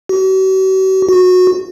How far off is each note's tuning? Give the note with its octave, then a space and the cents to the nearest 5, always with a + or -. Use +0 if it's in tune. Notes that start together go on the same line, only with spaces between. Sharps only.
F#4 +45
F#4 -20